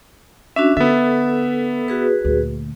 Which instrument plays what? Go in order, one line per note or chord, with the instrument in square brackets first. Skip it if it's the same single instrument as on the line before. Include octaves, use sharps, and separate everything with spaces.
[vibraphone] C#4 D4 F#4 [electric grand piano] E5
[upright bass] D3 [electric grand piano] B3 E5 [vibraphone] A4
[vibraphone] F#4 G#4 B4
[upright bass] D2 A#2